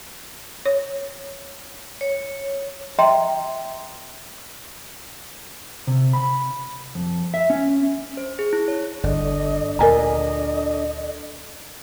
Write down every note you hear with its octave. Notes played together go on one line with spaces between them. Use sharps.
C#5
C#5
D#5 E5 G5 A#5 C6
C3
B5
F2
E5
C#4
C5
G#4
E4
C#5
G1 D4 A4 D5 D#5
D2 A#2 A#4 D#5 G#5 A#5